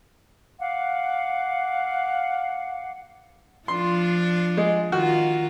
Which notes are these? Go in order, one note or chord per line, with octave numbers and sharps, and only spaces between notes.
F5 F#5 D6
F3 D4 F4 C6
G#3
D#3 F4 F#4